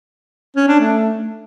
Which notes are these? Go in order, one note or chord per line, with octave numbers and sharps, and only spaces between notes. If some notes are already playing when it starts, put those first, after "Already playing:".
C#4
D4
A3